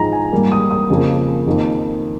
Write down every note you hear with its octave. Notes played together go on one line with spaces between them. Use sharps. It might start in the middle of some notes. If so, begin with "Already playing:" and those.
Already playing: G#2 F3 G#3 A#5
G#5
G#2 G3 A#3
D#6
D#6
F2 C#3 F3 A#3
F2 D#3 A#3